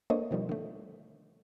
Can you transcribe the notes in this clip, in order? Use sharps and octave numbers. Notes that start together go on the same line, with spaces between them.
A3 A#3 D4 C5 C#5 D#5
B2 D#3 F3 G3
D3 A3